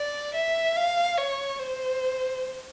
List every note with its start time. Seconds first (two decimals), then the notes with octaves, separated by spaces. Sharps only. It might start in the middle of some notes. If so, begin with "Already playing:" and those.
Already playing: D5
0.35 E5
0.76 F5
1.17 C#5
1.59 C5